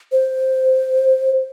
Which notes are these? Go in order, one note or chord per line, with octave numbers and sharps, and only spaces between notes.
C5